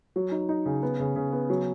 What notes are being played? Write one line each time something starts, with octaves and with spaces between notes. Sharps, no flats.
F#3
D#4
D#4
C#3
B3
C#3
C#3
B3
F#3